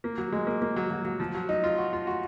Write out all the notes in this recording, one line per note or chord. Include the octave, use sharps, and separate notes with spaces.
A#3
F#3
G#3
A#3
A#3
F#3
F#3
F#3
F3
F#3
D#4
F4
F#4
F4
F#4